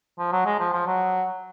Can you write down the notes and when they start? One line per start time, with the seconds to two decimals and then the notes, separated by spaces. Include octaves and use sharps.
0.19 F3
0.32 F#3
0.46 G#3
0.59 F3
0.73 F3
0.87 F#3